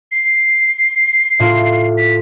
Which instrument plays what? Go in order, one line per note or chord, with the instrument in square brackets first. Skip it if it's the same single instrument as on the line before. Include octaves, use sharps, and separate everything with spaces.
[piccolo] C7
[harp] A2 F4
[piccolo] B6